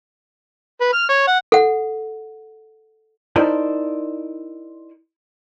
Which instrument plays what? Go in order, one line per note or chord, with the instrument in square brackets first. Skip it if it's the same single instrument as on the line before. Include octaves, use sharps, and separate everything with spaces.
[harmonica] B4
F6
C#5
F#5
[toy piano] A4 F#5
[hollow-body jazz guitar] D#4 E4 A#4 C5 D5 A5